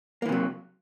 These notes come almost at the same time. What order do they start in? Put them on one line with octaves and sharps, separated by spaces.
A#3 E3 C3 F#3